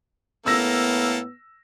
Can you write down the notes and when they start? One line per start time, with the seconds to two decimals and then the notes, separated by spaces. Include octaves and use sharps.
0.46 A2 A#3 B3 A4 E6 A#6